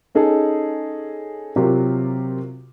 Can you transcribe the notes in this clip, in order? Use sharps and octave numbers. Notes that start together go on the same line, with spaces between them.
C#4 D#4 G#4 A4
C3 F#3 F4 G4 A#4